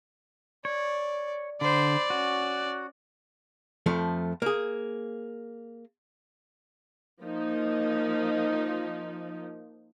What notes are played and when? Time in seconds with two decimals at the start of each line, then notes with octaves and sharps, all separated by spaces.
0.65 C#5 D5
1.61 D3 C5 D5 B5
2.10 C#4 F#4
3.86 F2 F3 A3
4.42 A#3 G#4
7.23 F3 A#3 D#4